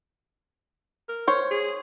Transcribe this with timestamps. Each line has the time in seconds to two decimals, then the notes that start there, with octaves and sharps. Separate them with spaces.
1.09 A#4
1.28 C5 C#5
1.51 G#4